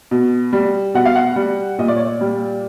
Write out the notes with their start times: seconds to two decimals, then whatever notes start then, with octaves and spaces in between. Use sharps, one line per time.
0.11 B2
0.53 G3
0.94 B2 F#5
1.05 F5
1.16 F#5
1.36 G3
1.78 A#2 D#5
1.88 D5
1.96 C#5
2.06 D5
2.21 G3